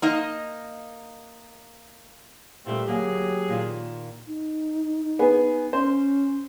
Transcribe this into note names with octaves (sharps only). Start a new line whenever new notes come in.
A#3 D#4 D#5
A#2 G3 A3 C4 G4
D2 F#3 A#3 G#4 G#5
A#2 D#3 F4
D#4
B3 G#4
C#4 C5